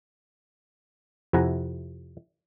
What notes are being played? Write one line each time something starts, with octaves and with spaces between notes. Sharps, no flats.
F2 C3 E4 F#5 G#5 A#5